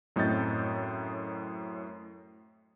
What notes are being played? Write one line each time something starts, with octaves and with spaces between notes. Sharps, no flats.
F#2 A2 C4 D#5 G6 A6